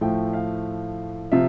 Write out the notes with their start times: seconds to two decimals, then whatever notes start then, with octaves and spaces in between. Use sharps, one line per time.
0.01 A2 F3 A3 G5
0.33 F5
1.32 C3 F3 C4 F4 E5